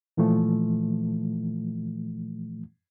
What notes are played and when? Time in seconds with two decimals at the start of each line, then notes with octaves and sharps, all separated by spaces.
0.17 A#2 E3 F3 A3